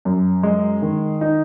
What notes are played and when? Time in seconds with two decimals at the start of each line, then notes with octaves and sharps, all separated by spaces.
0.05 F#2
0.43 G#3
0.82 D#3
1.21 D#4